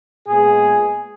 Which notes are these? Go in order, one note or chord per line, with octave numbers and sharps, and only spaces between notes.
A#2 G#3 B3 G#4